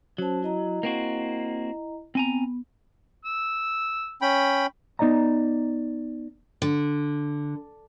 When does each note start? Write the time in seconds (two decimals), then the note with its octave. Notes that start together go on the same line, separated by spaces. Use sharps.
0.18 F#3 C#4 C5 A5
0.43 E4 D#5 A#5
0.83 A#3 C4 F#4
2.15 B3 C4 G#5 A#5
3.25 E6
4.22 C#4 G5 B5
4.99 B3 D#4 D5 D#5 A#5
6.62 D3